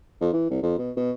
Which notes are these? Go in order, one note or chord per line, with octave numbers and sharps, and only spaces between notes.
F2
E3
C2
F2
B2
B2